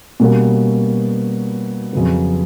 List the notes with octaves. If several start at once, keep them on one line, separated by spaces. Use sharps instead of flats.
B2 G3 A#3 C#4
F2 C#3 F#3 B3